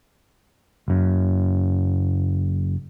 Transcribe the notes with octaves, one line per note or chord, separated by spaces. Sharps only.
F#1 F#2